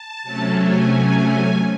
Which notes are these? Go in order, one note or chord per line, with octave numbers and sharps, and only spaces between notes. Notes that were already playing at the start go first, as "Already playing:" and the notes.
Already playing: A5
C3 F#3 A3 C#4
G#5
G#5